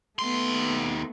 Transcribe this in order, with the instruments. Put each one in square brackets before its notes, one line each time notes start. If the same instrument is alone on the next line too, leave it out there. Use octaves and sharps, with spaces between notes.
[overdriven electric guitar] D#2 C6 [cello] A3 B3